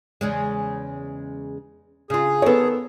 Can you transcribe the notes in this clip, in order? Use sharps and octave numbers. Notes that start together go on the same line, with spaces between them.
E2 C#3 G#3
C#3 F4 G#4
D#3 B3 A4 C#5